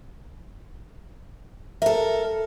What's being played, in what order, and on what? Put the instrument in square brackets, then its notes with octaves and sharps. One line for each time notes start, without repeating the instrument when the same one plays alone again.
[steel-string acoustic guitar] A4 A#4 [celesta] E5